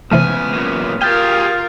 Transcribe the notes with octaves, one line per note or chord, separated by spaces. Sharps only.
C#2 C3 E3 A3 B3 G#5 F6
F#2 A#2
F4 G4 G#4 A#4 G5 F6 G6 A6